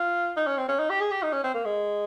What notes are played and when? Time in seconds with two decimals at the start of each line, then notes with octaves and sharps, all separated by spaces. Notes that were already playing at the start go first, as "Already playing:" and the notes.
Already playing: F4
0.37 D#4
0.47 C#4
0.58 C4
0.69 C#4
0.79 D#4
0.90 G4
1.00 G#4
1.11 G4
1.23 D#4
1.33 C#4
1.44 C4
1.54 A#3
1.65 G#3